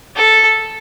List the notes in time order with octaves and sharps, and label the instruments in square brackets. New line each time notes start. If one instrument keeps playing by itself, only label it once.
[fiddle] A4